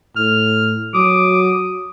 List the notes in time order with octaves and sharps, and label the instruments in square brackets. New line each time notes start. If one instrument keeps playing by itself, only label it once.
[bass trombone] A2 [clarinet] F6
[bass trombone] F#3 [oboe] D6 [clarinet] D#6